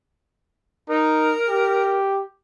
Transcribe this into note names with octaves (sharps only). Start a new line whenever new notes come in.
D#4 A#4
G4